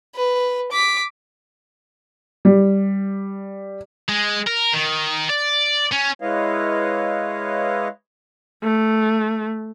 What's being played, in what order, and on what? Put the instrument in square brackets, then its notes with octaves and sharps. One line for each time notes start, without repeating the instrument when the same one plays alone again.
[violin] B4
D6 B6
[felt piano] G3
[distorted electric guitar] G#3
A#4
D#3
D5
C#4
[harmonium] G#3 E4 B4 C#5 D#5 F5
[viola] A3